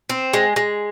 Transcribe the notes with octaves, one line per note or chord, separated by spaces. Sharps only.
C4
G#3
G#3